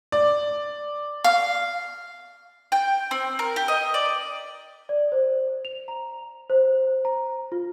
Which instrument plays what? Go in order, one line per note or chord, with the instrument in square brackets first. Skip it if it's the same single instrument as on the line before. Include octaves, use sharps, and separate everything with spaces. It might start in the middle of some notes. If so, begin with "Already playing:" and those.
[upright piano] D5
[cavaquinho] F5
[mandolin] G5
C4
A#4
G4
D#5
D5
[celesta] D5
C5
F7
A#5
C5
A#5
F4